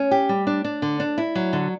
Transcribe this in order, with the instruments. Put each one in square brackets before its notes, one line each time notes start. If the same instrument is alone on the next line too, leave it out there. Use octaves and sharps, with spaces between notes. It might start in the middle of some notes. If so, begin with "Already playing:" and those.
Already playing: [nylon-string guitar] C#4
G4
G3
D4
D4
D3
D4
E4
F#3
D3